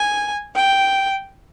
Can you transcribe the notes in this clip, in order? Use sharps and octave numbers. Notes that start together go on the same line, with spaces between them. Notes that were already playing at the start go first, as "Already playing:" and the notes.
Already playing: G#5
G5